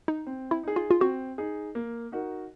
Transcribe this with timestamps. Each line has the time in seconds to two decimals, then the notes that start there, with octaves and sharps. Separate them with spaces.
0.08 D#4
0.27 C4
0.51 E4
0.63 D#4 G#4
0.76 F4
0.91 F4
1.00 C4 F#4
1.38 D#4 G#4
1.75 A#3
2.12 D#4 F#4 A#4